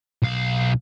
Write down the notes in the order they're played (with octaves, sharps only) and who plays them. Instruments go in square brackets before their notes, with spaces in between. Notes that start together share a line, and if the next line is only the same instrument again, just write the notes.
[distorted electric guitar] B1 F5